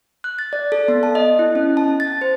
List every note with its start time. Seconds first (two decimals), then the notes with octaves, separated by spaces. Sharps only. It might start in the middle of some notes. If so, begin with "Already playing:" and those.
0.24 F#6
0.39 A6
0.53 D5
0.72 A4
0.88 B3
1.03 A5
1.15 D#5
1.39 E4
1.55 C#4
1.77 A5
2.00 A6
2.21 C5